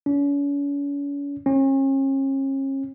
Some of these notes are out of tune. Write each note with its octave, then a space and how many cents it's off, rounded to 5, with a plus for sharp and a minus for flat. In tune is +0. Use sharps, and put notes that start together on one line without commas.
C#4 +40
C#4 -40